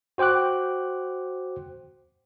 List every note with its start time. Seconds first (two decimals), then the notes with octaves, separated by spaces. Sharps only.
0.18 F#4 C5 G5 D6 F#6